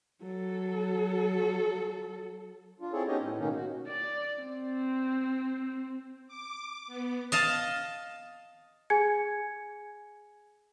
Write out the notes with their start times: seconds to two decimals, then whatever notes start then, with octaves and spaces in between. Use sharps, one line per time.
0.23 F#3 A4
2.80 D4 F4
2.92 C4 E4 G#4 A4 C#5
3.07 B3 C#4 D#4 G4 C#5 D#5
3.19 A2
3.38 B2 D#3 A#3 C#4 D#4
3.54 F#4
3.87 D5
4.43 C4
6.28 D6
6.87 B3
7.32 D#5 F5 A5
8.90 G#4 G#5 G#6 C#7